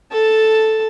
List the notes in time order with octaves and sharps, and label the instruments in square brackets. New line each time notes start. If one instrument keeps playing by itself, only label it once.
[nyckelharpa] A4 A5